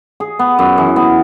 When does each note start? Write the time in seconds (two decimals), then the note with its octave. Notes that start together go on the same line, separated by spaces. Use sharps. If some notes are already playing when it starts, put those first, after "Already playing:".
0.20 G#4
0.39 B3
0.59 F#2
0.78 E3
0.96 B3